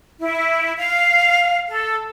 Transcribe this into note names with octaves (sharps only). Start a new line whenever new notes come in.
E4
F5
A4